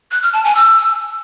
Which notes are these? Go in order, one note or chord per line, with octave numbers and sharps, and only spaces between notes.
F#6
F6
A5
G#5
E6